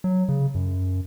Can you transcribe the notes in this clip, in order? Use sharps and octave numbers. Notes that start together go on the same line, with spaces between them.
F#3
C#3
F#2